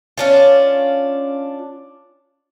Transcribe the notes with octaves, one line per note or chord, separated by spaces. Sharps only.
C#4 D4 F4